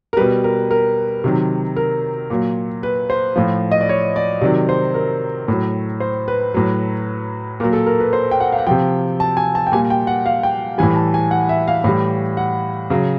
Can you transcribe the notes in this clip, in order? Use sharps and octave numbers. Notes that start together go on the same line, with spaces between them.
A#4
B2 G3 B4
A#4
A#4
C3 D#3 F#3
A#4
A#2 F#3
B4
C5
A2 F3
D#5
D5
C#5
D5
C3 D#3 F#3 D5
C5
A#4
A2 F#3
C5
B4
A2 F#3
A#2 F#3 A#4
A4
A#4
B4
C5
G5
F#5
F5
F#5
C3 F3 G5
A5
G#5
A5
G5
A#2 G3 G#5
G5
F#5
F5
G5
A2 E3 G3 G#5
A5
G#5
F#5
E5
F5
A2 E3 G3
F#5
C#3 F#3